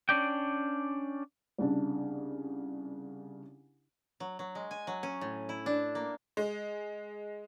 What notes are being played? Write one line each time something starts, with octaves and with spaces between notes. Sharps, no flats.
C#4 D4 D5 G5
C2 C#3 D4
F#3
F#3
G#3
G#5
F#3
C#4
A2
E4
D4
A#3
G#3